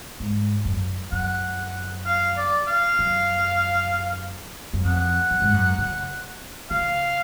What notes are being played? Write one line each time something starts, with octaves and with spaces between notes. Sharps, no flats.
G#2
F#2
F#2 F#5
F5
D5
F5
F#2
F#2
F2 F#5
F#2
G#2
F#2
C#3
C#3 F5